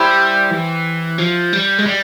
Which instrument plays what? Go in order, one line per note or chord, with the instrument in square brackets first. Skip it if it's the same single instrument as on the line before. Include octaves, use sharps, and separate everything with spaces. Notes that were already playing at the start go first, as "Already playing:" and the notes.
Already playing: [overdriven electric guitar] G3 [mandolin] E4 G4 C5 E5
[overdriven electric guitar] E3
F3
G3
G#3
G3